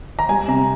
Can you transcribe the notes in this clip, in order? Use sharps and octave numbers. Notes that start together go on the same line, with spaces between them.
A#5
G3 G#5
C3 A#5